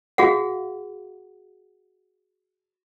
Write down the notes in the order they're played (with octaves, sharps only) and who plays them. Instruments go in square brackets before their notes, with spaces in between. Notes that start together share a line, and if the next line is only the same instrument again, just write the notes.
[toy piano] F#4 G#4 F5 F#5